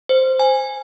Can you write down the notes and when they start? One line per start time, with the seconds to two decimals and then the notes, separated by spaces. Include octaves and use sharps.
0.09 C5
0.39 G#5